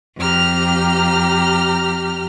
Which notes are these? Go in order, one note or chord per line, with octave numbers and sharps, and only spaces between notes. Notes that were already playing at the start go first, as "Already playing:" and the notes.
F2 G4 A#5 F6